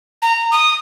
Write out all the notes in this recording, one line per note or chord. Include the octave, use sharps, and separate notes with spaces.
A#5
D#6